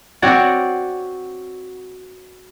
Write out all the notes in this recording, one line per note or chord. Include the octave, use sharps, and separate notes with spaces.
C4 F#4 C#5 D5 F#5